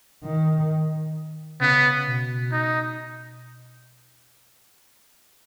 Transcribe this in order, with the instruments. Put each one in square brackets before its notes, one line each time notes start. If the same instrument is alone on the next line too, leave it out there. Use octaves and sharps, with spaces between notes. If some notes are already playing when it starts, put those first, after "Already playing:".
[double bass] D#3
[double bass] C#3 [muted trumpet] B3
[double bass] B2
[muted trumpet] D#4